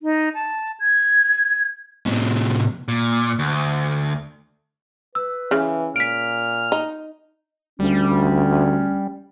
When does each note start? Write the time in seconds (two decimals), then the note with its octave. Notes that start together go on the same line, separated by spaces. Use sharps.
0.03 D#4
0.35 A5
0.80 G#6
2.06 A2 C3
2.88 A#2
3.39 D2
5.15 B4 E6
5.51 C#3 E3
5.96 A#2 F6 B6 D7
6.72 D#4
7.80 D2 G3 C#4